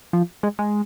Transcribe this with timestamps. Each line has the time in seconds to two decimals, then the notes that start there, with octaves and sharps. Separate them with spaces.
0.13 F3
0.43 G#3
0.59 G#3